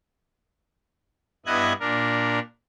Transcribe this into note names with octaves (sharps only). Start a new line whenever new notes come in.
G2 B3 E4 D#5 F#6 G#6
A#2 D4 A#4